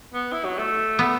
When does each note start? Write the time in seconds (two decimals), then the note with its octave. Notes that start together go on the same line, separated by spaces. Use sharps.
0.14 B3
0.32 E4
0.45 F#3
0.58 A3
0.99 B3